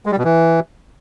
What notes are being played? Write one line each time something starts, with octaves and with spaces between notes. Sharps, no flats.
G#3
G3
B2
E3